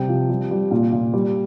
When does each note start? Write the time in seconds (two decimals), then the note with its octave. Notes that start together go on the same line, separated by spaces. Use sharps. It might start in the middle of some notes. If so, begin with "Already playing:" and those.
Already playing: C3 G3 G5
0.08 F3
0.30 G3
0.51 G3
0.71 A#2 F5
0.93 A#2
1.14 G3